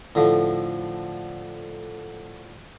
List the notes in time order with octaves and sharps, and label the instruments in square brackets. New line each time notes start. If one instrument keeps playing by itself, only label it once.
[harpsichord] A2 D3 F3